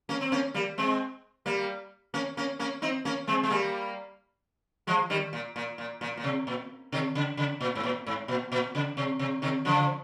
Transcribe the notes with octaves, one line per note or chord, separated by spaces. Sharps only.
A#3 C#4
C4
A#3 C#4
G3 A#3
G#3 C4
G3 A#3
A#3 C#4
A#3 C#4
A#3 C#4
C4 D#4
A#3 C#4
G#3 C4
G#3
G3 A#3
F3 G#3
D#3 G3
A#2
A#2
A#2
A#2
A#2
C3
A#2
C3 D#3
C#3
C#3
A#2
G#2
A#2
G#2
A#2
A#2
C#3
C3
C3
C3 D#3
C#3 F3